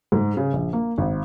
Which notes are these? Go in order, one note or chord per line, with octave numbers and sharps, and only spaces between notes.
G#2
C#3
A#1
A#3
G#1